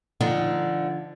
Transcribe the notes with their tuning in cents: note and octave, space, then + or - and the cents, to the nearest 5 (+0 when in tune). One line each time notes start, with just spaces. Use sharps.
D3 +0 F3 -30 D#4 +0